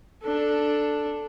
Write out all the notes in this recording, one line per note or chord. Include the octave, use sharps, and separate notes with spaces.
D4 A4